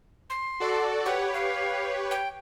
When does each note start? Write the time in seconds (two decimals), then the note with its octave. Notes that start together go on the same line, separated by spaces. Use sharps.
0.30 C6
0.60 F#4 A4 D5
1.06 G4 B4 C#5 F#5
1.34 F5
2.11 G5